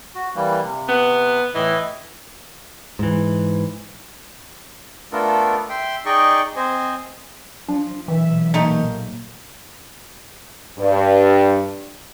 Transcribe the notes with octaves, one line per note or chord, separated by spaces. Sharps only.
F#4
E3 G3 A#3
C3
B3
A2 E3 E4 D#5
G#2 E3
A3 B3 D4 F4 A4 A#4
E5 G5 C6
D#4 G#4 D5 D#5 G5 C#6
C4 C5 D#5 G#5
F3 D4
B1 A#2 E3 E5
A3 A#3 D#4 G4
G2